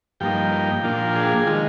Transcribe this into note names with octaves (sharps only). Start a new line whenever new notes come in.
G2 F3 A#3 D#4 G5
A#2 F3 A#3 D4 F4
G#4
D#3 G#3 F4